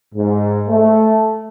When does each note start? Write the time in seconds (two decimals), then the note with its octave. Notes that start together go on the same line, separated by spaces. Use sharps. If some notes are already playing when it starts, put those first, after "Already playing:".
0.15 G#2
0.69 A3